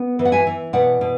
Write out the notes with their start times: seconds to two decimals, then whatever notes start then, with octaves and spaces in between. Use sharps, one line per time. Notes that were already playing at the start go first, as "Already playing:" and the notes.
Already playing: B3
0.19 E3
0.25 F#5
0.32 E5 G#5
0.47 E3
0.73 B2 D5 F#5
1.01 B2